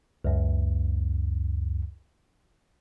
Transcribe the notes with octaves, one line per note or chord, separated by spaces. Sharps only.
C#2 F#2